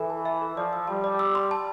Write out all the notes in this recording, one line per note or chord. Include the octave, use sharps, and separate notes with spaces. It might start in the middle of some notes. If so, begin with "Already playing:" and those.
Already playing: E3 A4
A5
E5
A4
F3 D5
E6
G3 A5
D5
E6
C6
A5